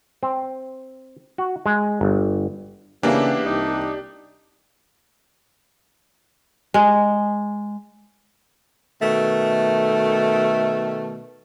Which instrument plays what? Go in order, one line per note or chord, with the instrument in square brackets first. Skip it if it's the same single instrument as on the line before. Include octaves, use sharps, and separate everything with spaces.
[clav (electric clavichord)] C4
F#4
G#3
G1
[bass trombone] C#3 [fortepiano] E3 A#3 E4 [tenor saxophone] B3 [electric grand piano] D4 G4
[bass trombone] C2 [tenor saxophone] D#4
[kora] G#3
[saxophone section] B2 D#3 A3